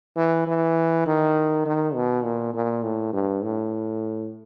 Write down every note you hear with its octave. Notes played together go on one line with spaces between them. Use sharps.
E3
E3
D#3
D#3
B2
A#2
A#2
A2
G2
A2